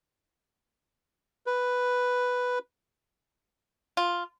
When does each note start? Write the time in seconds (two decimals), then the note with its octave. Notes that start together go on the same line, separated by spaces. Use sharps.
1.47 B4
3.97 F4